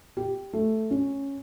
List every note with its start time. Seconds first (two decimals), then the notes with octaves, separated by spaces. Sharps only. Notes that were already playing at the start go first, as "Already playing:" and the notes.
0.17 G4
0.53 A3
0.91 C#4